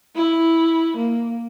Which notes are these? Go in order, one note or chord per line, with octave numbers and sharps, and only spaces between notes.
E4
A#3